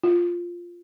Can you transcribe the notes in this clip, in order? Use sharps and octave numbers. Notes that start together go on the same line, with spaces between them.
F4